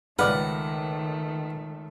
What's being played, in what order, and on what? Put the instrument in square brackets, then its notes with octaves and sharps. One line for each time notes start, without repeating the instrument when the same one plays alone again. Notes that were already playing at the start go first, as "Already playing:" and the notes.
[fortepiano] C#2 D5 F6 [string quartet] D#3 A3 [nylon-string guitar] B4 [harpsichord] F#5